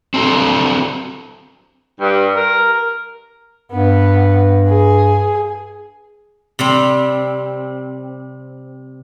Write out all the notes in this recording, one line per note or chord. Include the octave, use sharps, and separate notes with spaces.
C4 D4 F#4 A4
G2
A#4
G2 B3
G#4
C3 G3 C4